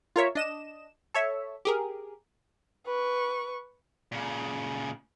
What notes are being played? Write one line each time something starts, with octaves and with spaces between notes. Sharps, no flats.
F4 A#4 C#5 E5
D4 D#5 E7
A4 C#5 E5
G4 G#4 A#4
B4 C#6
A#2 C#3